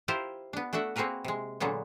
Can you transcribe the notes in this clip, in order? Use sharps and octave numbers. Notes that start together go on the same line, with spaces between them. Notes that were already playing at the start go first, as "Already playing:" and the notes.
E4 F4 G4 A#4 C5
B3 D4
A3 D4 F#4 E5 F#5
A#3 C4 F#4 G#4 A#4 B4
C3 G#3
A#2 D3 F#3 G#3 A#3 B3